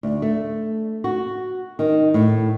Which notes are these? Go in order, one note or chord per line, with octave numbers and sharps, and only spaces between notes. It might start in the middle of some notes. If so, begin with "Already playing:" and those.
D2
A3
F#4
D#3
A2